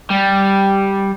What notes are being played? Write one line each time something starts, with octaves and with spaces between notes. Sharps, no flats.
G3